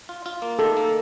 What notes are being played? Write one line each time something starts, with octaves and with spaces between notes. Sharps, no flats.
F4
F4
A#3
D#3 A4
A#3